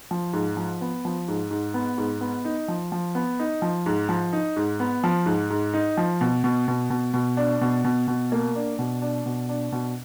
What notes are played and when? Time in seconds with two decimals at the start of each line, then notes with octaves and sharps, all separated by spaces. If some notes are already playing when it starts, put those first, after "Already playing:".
0.11 F3
0.33 G#2
0.57 F3
0.81 B3
1.05 F3
1.28 G#2
1.51 G#2
1.74 B3
1.98 G#2
2.21 B3
2.45 D#4
2.68 F3
2.92 F3
3.15 B3
3.39 D#4
3.62 F3
3.86 G#2
4.09 F3
4.33 D#4
4.56 G#2
4.80 B3
5.04 F3
5.26 G#2
5.50 G#2
5.74 D#4
5.97 F3
6.21 B2
6.44 B2
6.68 B2
6.90 B2
7.14 B2
7.37 D4
7.61 B2
7.84 B2
8.08 B2
8.32 A#3
8.55 D4
8.79 B2
9.02 D4
9.26 B2
9.49 D4
9.72 B2